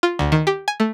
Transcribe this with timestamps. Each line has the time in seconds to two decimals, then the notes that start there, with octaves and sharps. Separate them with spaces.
0.03 F4
0.19 D2
0.32 D#3
0.47 G4
0.68 G#5
0.80 A3